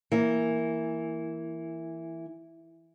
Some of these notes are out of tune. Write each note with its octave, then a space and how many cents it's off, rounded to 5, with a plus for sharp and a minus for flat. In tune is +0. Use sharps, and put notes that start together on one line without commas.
E3 +0 A#3 +0